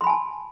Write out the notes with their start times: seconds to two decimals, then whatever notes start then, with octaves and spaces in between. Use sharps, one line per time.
0.01 C6
0.04 B5
0.07 G#5
0.10 A5